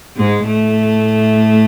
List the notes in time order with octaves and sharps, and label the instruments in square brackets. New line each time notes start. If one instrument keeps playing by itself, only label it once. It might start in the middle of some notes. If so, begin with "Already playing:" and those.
[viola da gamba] G#2 G#3
A2 A3